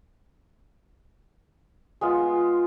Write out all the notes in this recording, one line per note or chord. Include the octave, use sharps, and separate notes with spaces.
G#3 B3 F4